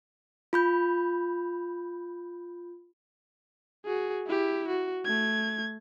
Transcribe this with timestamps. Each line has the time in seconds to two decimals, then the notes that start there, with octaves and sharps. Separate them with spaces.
0.53 F4 B5 G6
3.85 F#4 G#4
4.27 E4 G4
4.68 F#4
5.05 A3 G#6